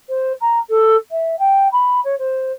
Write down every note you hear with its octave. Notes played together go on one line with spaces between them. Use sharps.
C5
A#5
A4
E5
G5
B5
C#5
C5